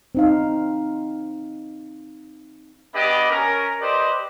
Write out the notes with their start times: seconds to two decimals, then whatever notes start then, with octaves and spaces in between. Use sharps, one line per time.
0.15 C4 D#4 F5
2.94 B3 D4 G4 D#5 B5
3.30 C#4 A#4
3.81 G4 B4 C5 D5 D#5